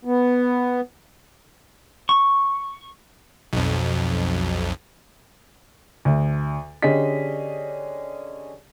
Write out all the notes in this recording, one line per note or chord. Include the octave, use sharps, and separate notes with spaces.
B3
C#6
B1 F2
D2
D3 C#4 G4 G#4 D#5 B6